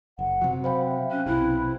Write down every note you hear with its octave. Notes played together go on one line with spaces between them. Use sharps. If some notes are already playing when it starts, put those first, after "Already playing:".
F#1 F#5
C3 F#3
C5 F5 G5 B5
E5
C#4 F#6
B1 C3 E4